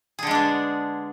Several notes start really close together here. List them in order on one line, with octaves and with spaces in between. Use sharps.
G#4 D3 G#3 D4 B3